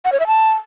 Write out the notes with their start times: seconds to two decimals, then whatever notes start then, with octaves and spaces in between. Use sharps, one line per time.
0.05 F#5
0.12 C#5
0.20 E5
0.27 A5